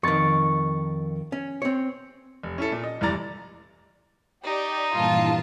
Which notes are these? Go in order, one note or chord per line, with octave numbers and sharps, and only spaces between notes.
F2 D#3 C#6 A6
C#4
C4 C#5
F1
C#4 E4 A4
A#2
D#5
F1 G2 E3 D5 A#5 A6
D#4 G4 D5
G2 A#2 E3 F4 A5